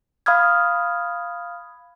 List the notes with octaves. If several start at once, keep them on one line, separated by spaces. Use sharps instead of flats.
F5 B5 D#6 F6 G#6